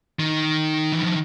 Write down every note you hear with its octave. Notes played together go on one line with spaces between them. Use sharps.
D#3
E3
F3